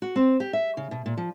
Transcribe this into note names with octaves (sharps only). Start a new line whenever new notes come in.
F#4
C4
G4
E5
C#3
B2
A#2
F3